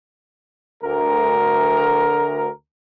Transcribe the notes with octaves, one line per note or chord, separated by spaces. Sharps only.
D2 A#4